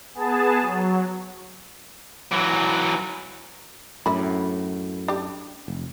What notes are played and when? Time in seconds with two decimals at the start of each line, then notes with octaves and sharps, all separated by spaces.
0.14 B3 G#4 A5
0.60 F#3
2.32 E3 F#3
4.06 F#2 A2 D3 E4 B5
5.08 D4 G4
5.68 F1